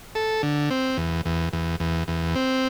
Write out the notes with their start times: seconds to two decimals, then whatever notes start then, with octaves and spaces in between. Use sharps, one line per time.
0.15 A4
0.43 D3
0.71 C4
0.98 E2
1.25 E2
1.53 E2
1.80 E2
2.08 E2
2.35 C4